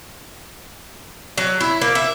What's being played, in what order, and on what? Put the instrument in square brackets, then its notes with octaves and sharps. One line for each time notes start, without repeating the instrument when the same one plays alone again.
[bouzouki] F#3
E4
A#3
E5